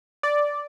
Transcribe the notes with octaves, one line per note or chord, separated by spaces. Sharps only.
D5